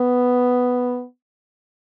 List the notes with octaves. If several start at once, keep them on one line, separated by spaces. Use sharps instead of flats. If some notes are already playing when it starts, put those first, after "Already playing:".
Already playing: B3